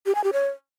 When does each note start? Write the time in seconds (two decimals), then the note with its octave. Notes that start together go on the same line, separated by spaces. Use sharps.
0.06 G4
0.15 G#5
0.24 G4
0.33 C#5